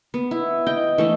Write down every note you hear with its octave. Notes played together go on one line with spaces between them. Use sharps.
B3
E4
D#5 G5
E3 A3 D#5